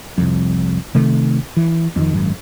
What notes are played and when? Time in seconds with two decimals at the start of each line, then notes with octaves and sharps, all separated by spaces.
0.18 C2 F2
0.95 C3 D#3 A3
1.57 E3
1.96 F2 D#3
2.13 G#1 F#2